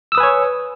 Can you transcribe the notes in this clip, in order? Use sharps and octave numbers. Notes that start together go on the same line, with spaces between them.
B4 C#5 G#5 D#6 E6